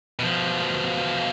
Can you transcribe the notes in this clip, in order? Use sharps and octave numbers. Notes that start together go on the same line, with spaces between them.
B2 F3